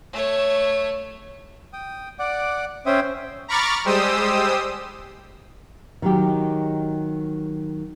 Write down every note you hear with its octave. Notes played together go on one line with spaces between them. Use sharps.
A3 C#5
G5 D#6
D5 F#5 D6
C#4 C5 E5 G5 D#6
A#5 B5 C#6 D6 F6 A6
G3 G#3 G4 C5 D#6 E6
D#3 F#3 G4